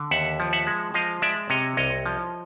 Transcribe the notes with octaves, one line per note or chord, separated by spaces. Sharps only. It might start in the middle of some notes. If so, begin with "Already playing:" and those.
Already playing: D3
D#2 E5 F#5
F3
E5 F#5
G#3
F3 D#5 F5
G#3 D5 E5
C3 C#5 D#5
C2 C#5 D#5
F3